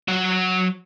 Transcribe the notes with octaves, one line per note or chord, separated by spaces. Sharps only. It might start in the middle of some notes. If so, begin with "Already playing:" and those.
F#3 F#5